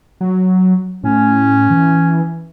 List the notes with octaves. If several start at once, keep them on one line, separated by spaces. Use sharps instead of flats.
F#3
A2 C#4
E3